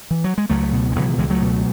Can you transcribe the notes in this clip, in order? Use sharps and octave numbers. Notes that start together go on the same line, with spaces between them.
E3
F#3
G#3
C#2 F#3 A3
B2
G#3
C#2 D#3 F#3
E3
C#2 E3 G#3
F#3 A3
B2